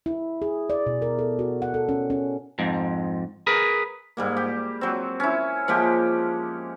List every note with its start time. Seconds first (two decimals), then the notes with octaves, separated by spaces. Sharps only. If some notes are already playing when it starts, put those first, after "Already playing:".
0.06 E4
0.42 G#4
0.70 D5
0.86 B2
1.02 A#4
1.19 A4
1.39 F#4
1.62 F#5
1.74 A4
1.89 C#4
2.10 C#4
2.59 F2 G#2
3.47 G#4 A#4 B4
4.17 G#2 G3 A#3
4.37 G4
4.81 F#3 C4
5.20 C#4 E4
5.68 F3 G#3 A#3 G4